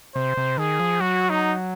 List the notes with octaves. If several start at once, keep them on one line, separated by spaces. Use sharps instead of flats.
C3 C5
C3
D#3 G#4
F3
F#3 F#4
D#4